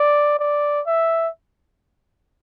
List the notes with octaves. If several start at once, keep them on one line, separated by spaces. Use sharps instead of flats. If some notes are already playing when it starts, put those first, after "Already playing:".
Already playing: D5
D5
E5